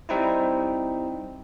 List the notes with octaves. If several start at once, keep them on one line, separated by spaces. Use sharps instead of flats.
G3 C4 D#4 E4